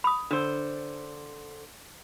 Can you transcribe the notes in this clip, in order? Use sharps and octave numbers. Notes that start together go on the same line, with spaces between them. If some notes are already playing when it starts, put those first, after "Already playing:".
B5 D#6
D3 D4 C5